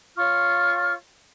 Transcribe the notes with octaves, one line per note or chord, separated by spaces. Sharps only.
F4 C#5 C#6 F6